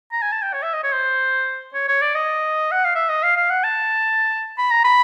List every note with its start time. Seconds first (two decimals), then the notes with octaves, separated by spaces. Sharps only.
0.12 A#5
0.22 G#5
0.32 A5
0.42 G5
0.53 C#5
0.63 E5
0.73 D#5
0.83 C#5
0.93 C5
1.74 C#5
1.88 C#5
2.02 D5
2.15 D#5
2.72 F#5
2.84 F5
2.95 E5
3.09 D#5
3.23 F5
3.37 F5
3.50 F#5
3.64 A5
4.58 B5
4.71 A#5
4.85 B5